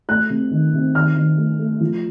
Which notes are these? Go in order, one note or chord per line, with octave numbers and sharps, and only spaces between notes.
A3 F#6
C3
D#3
C3
D#3 F6
D#3
A3
A3
F3